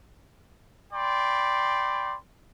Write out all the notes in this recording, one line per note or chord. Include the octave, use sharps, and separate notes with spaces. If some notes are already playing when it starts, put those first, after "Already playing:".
D5 G5 B5 C6